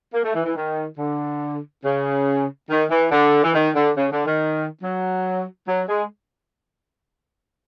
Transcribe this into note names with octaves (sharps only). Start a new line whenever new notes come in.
A#3
A3
E3
E3
D#3
D3
C#3
D#3
E3
D3
E3
D#3
D3
C#3
D3
D#3
F#3
F#3
G#3